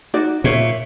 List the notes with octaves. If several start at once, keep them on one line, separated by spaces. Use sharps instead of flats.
D#4 F#4 D5
A#2 C5 C#5 E5